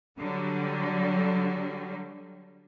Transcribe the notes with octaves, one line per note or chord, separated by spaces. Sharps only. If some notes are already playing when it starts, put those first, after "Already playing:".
D3 F#3 G3